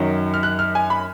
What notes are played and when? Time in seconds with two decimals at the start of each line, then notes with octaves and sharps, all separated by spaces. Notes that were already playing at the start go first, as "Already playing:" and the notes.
Already playing: F#2 D#3 F#3
0.34 F6
0.43 F#6
0.59 F6
0.75 G#5
0.90 B5